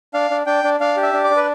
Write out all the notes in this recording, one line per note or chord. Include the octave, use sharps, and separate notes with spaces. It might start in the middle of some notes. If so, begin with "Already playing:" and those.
D4 F5
D4
D4 G5
D4
D4 F5
G4
E5
D4
D5
D4
B4